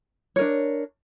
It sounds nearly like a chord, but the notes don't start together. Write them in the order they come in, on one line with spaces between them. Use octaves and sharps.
C#5 A#4 D4